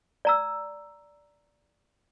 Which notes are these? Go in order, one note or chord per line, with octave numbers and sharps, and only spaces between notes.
D5 A#5 E6